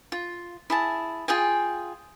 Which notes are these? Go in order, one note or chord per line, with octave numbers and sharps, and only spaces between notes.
F4
E4 G#4 A5
F4 G#4 G5 G#5